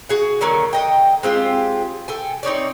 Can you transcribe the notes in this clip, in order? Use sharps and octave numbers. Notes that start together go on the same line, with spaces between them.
F#4 G#4 F#5
D3 D#3 F#3 A#3
D3 D#5 G5
G#3 C4 F4 G4
A4 G5 G#5
C4 D#4 C#5 D5